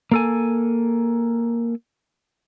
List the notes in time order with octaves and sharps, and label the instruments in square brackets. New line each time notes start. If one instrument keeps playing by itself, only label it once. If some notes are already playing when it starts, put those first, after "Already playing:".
[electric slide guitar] A#3 A4 G#5